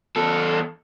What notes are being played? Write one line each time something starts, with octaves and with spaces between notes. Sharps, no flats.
E2 A4